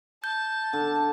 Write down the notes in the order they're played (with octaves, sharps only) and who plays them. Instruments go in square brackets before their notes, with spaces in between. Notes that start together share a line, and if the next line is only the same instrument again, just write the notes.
[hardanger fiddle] A5 [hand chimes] G6
[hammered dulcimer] D3